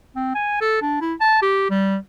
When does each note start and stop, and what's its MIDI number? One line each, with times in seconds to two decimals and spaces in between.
0.16 0.34 60
0.35 0.58 80
0.61 0.78 69
0.82 0.98 62
1.01 1.14 64
1.21 1.38 81
1.42 1.67 67
1.71 1.97 55